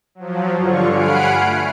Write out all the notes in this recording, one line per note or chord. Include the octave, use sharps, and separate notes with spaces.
F3 F#3
G2 D3 F4 C#6
F#5 G#5 B5 F6 C7 D7
A3